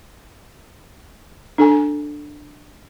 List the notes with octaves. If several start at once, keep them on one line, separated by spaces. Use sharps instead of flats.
D4 A4 G#5